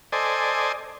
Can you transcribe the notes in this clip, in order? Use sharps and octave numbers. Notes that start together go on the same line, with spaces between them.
A4 C5 D5 D#5 G#5